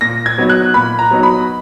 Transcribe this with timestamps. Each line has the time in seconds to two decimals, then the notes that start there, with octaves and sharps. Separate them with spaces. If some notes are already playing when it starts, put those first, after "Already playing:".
0.01 A#2 A#6
0.26 G#6
0.38 F#3 B3 D#4
0.50 F#6
0.74 A#2 B5
0.99 A#5
1.11 F#3 B3 D#4
1.23 B5